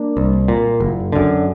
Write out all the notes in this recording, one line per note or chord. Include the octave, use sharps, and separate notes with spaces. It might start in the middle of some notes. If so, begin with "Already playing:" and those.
Already playing: A#3 D4
C2
A#2
F#1
F#2 D3